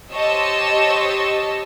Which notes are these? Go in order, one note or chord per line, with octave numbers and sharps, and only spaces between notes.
G4 C5 C#5 D#5 A5 E6